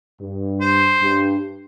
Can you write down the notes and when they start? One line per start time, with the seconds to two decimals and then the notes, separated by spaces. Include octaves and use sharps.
0.21 G2
0.61 C5
1.01 G2